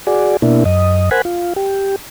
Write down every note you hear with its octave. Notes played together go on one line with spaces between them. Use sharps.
F#4 G#4 D5
B2 A#3 D4 E4
F#2 D#5
A#4 C5 F#5 G#5 B5
F4
G4